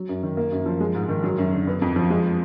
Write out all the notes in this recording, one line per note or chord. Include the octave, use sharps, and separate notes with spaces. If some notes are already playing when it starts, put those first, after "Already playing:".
Already playing: F#3
F#2
D#3
A#3
F#2
F3
G#3
G#2
D#3
F#3
F#2
D3
B3
F2
F3
G#3